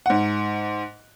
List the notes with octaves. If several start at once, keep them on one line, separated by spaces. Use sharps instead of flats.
G#2 F#5